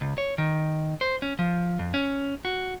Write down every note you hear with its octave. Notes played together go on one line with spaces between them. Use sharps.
C#2
C#5
D#3
C5
C#4
F3
F2
C#4
F#4